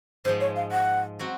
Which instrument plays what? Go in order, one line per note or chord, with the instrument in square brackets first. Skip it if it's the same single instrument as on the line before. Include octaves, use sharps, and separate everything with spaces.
[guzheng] G#2 [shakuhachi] C5
[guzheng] F3 G#3
[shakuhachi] C#5
F5
F#5
[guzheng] F#3 C4 F#4